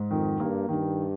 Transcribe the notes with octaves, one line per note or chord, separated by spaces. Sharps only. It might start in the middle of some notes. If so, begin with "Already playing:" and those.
Already playing: G#2
F2 D#3
G2 A#3
G2 D#3